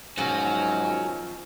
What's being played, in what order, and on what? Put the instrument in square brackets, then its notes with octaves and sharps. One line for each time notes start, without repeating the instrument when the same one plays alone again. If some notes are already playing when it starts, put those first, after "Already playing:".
[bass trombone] G#2 [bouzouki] B2 D#3 F3 [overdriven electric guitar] F#3 F#4 [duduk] C#4